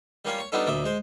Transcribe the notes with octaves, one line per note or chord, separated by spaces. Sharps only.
G3 A#3 C#4 F4 C#5 F5
C#5 C#6
G3 B3 D4 D#4 F4 A4
D2 A#2 D#5 E5 D6
G#3 C5